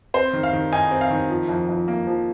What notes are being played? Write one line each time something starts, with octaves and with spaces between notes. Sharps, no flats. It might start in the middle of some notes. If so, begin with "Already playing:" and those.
C4 C5
D#3
F5
D#3
D#4 G#5
C4
F5
D#3
F3
F2
F2
A#3
F3